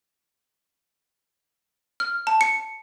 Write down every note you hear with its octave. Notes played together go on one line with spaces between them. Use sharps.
F6
A5
C#7